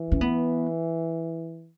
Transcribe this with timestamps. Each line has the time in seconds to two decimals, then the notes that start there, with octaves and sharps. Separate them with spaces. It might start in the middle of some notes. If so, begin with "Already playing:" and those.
Already playing: E3
0.12 C#4
0.21 B3